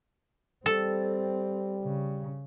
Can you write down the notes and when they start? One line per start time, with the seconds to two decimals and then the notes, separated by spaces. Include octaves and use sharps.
0.66 G3 C4 A4
1.83 C#3